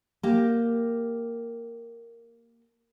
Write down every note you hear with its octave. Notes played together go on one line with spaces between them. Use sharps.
A#3 G4